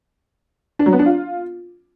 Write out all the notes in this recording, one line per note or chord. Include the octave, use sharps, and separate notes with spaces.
D4
F#3
B3
D4
F4